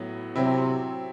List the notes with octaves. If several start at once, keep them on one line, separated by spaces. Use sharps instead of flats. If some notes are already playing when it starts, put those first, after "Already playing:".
Already playing: A2 F#3 B3
C3 F#3 C4 E4